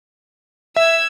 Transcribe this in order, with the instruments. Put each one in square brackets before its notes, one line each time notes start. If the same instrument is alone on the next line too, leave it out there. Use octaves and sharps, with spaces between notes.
[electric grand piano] E5 [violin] E6 G#6